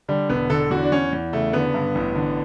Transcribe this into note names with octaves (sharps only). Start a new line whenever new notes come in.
D3 G3
E1 B3
D3 A4
E2 F#4
D4
E2 C#4
E2
C#3 A3
D3 B3
G2
A1
D3